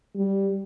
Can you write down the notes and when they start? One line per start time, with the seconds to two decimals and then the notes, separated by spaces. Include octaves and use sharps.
0.16 G3